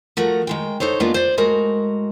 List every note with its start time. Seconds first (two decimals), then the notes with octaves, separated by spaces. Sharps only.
0.17 F3 A3 F#4 A#4
0.47 D#3 G#3 G5
0.80 D#4 A4 C5 C#5
1.00 G#3 A#3 B3 D4 F4
1.14 C5 D5
1.37 A2 G#3 F#4 A#4